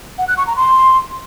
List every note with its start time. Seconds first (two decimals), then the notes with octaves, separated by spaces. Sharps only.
0.18 F#5
0.28 F#6
0.37 C#6
0.47 A#5
0.56 C6